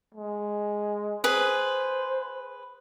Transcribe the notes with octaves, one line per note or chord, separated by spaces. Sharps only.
G#3
G#4 B4 C5